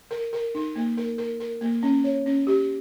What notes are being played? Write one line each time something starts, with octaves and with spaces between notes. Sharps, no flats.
A#4
A#4
D#4
A#3
A#4
A#4
A#4
A#3
C#4
C#5
C#4
G4